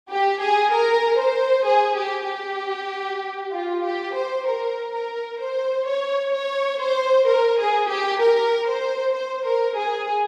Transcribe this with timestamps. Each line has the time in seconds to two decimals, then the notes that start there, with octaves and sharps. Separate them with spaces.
0.09 G4
0.41 G#4
0.72 A#4
1.19 C5
1.66 G#4
1.97 G4
2.28 G4
3.52 F4
3.84 G4
4.15 C5
4.47 A#4
4.93 A#4
5.40 C5
5.87 C#5
6.33 C#5
6.80 C5
7.28 A#4
7.59 G#4
7.89 G4
8.21 A#4
8.68 C5
9.14 C5
9.46 A#4
9.77 G#4